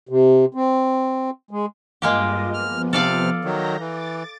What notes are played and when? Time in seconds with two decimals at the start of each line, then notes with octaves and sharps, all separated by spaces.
0.09 C3
0.55 C4
1.51 G#3
2.02 G2 G#3 A#3 F4 G4 D#5
2.54 F3 B3 F6
2.93 C3 A4 D5 F5 F6
3.45 D#3 F#3 A#5 G6 A#6
3.80 E3 D6 A6